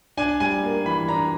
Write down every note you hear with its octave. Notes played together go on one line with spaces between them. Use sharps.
D4 G#5
G3 G#5
A#3
E3 B5
D4 A#5